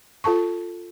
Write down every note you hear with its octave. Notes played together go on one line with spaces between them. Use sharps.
F4 A4 A5 C#6